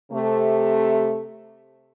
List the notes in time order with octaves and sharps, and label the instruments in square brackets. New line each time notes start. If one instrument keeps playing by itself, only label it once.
[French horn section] C3 A3